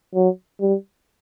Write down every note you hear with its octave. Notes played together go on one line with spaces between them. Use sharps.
F#3
G3